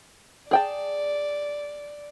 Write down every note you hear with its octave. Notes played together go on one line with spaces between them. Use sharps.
G#4 D5 G5 A5